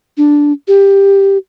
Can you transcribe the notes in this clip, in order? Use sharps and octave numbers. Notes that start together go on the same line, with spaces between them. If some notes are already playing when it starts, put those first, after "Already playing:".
D4
G4